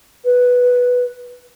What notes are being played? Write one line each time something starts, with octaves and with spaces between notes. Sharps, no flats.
B4